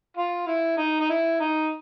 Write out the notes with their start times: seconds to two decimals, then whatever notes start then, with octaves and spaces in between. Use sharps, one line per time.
0.17 F4
0.47 E4
0.78 D#4
1.00 D#4
1.10 E4
1.40 D#4